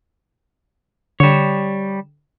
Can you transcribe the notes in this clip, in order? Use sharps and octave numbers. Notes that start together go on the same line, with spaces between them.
D3 G3 C#5 E7